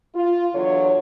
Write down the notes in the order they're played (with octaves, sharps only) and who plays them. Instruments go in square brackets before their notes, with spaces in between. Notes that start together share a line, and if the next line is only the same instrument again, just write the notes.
[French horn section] F4
E2 D3 F#3 C#5